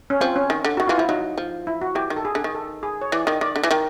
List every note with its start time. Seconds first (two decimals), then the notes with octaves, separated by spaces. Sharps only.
0.10 C#4
0.21 F3 C4
0.36 C#4
0.50 D#3
0.64 D3
0.77 D#3 F#4
0.87 E3 F4
0.98 F3 E4
1.09 F#3 D#4
1.38 F3
1.67 E4
1.82 F#4
1.95 E3 G4
2.10 D#3
2.16 A4
2.25 G#4
2.35 D3
2.44 D#3
2.55 A4
2.83 G#4
3.02 C#5
3.12 E3 D5
3.27 D#3 D#5
3.41 D#3 D5
3.56 D3
3.63 E3
3.71 D#3